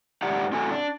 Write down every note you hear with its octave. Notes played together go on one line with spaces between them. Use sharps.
G#2 D#4 G4 D5 F#5
A2 C4 F#4 A4 G#5
D4